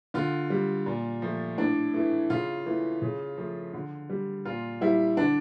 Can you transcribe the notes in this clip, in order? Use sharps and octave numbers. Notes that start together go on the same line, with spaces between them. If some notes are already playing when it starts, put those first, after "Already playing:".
D3 F4
G3
A#2
F3 A3
A2 D4
E3 A3
C#3 F4
E3 A3
C#3
F3 A3
D3
G3
A#2 F4
G3 E4
D3 D4